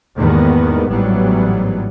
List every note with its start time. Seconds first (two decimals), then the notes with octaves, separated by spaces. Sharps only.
0.17 E2 G#2 D#3 G3 A#3 B3
0.89 A1 G#2 E3 F#3 G3 B3